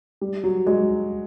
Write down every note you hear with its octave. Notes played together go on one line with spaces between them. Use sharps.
G3
F#3
F#3 G#3